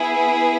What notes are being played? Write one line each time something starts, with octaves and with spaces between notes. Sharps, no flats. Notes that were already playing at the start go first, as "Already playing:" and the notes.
Already playing: B3 E4 G#4